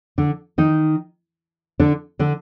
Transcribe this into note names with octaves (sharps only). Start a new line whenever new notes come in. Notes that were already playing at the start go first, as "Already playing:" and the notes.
D3 D4
D#3 D#4
D3 D4
D3 D4